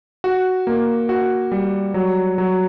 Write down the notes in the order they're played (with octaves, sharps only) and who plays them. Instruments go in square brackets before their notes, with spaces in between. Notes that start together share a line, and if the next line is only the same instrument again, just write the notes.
[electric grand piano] F#4
A#3
F#4
G3
F#3
F#3